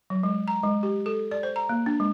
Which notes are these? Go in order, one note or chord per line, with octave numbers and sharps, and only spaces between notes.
F#3
G#3
A#5
G#3
G4
A4
D5
C5
A#5
A#3
D4
G#3